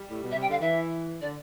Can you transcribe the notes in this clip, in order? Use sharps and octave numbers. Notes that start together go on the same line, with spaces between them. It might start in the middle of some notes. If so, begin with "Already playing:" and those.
Already playing: G3
A2
B2
E5
C3
G5
D3 F5
E3 E5
D3 D5